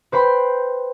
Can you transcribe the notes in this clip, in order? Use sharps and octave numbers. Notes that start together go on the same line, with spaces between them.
B4 C5 G5 B5 C6